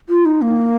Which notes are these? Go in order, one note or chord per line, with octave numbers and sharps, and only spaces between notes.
F4
D#4
A#3